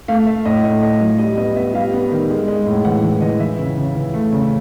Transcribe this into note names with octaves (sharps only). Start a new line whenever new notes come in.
A3 F5
A3 E5
A2 D#5
A3 D#5
A3 D#5
F#3
G3 D#5
B3 D#5
B3 E5
G3 F5
B3
D#3
G#3
G#3
A2
E3 F#5
E3
E3 D#5
E3 E5
C#3
C#3
E3
A3
C#3